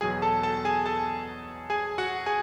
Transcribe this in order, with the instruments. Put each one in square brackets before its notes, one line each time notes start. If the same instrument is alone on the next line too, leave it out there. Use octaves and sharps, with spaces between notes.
[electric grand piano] E2 B2 F#3 G#4 G#5
A4 A5
A4 A5
G#4 G#5
A4 A5
G#4 G#5
F#4 F#5
G#4 G#5